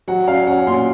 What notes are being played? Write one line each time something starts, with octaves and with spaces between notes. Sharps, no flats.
F#3 F#5
C#4 F5
C#4 F#5
A#2 C6